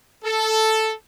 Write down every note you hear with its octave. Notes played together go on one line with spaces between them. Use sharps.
A4